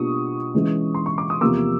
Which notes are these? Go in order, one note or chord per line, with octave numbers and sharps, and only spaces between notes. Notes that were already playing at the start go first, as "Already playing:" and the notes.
Already playing: B2 G3 A#3 D4 F4 C#6 D#6
E3 G#3 C#4
C6
C#6
D6
D#6
E2 C3 F3 A#3 D6 E6